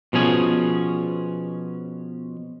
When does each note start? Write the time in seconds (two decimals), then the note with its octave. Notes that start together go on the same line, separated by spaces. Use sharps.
0.13 B2 F3 C#4 G#4